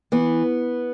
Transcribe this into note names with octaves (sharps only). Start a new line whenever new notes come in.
E3 B3